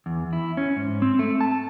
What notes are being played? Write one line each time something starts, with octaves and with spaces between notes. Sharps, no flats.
E2
E4
C#4
G#2
C4
A3
A5